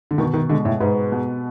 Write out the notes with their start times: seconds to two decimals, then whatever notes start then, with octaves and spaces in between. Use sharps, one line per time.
0.11 D3
0.18 B2 D#3
0.34 D#3
0.49 D3 G#3
0.65 A2
0.80 G#2 B3
1.12 B2